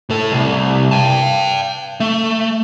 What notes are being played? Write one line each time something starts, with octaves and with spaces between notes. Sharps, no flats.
A2 A4
C2
G5 A5
A3